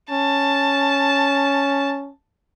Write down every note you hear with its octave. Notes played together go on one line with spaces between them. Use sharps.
C#4 A5